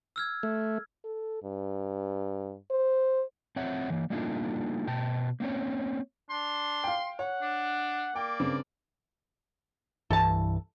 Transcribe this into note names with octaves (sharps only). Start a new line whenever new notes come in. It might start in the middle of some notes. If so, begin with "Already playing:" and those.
E6 F6 G#6
A3
A4
G2
C5
C4 C#5 E5 F#5
E3 A#3
G3 A3 A#3 D4 D#4 F4
B2 G5 A5
A#3 C4 C#4 C#5
D4 C6
F5 G5
C#5 F#5
D4
A#3 D5 G5
G2 C#3 C4
C2 G2 E3 A4 A5